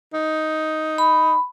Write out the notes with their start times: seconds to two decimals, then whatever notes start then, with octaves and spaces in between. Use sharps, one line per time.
0.14 D#4
0.98 B5